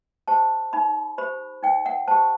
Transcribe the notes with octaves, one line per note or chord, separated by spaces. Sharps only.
G4 C5 A5
D#4 B5
G4 C5 B5
D#4 G5
F#5
G4 C5 A5